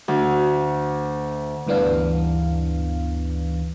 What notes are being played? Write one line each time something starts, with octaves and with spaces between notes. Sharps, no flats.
D2
D2 G2 E3 B3 D4 F5